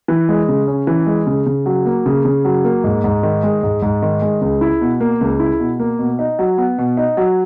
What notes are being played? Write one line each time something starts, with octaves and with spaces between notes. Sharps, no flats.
E3
G#3
C#3
C#4
E3
G#3
C#3
C#3
F#3
A#3
C#3
C#3
F#3
A#3
G#2
G#2
D#3
G#3
G#2
G#2
D#3
G#3
C#2
E4
B2
A#3
C#2
E4
B2
A#3
B2
D#4
F#3
B3
B2
D#4
F#3